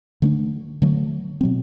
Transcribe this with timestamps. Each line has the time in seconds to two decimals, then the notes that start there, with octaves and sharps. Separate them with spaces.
0.22 D3 A3 D4
0.82 D3 F#3 A3
1.41 B2 F#3 C4